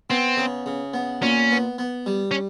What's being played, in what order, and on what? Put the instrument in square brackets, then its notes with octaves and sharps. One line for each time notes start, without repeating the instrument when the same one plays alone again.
[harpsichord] B3 [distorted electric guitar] C4
[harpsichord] C#3
C#3
B3
[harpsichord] A#2 [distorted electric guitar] C#4
[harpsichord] B3
B3
G3
[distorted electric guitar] C#4